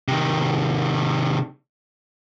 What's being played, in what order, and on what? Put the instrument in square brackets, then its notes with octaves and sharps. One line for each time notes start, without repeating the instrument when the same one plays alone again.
[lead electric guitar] C3 D#3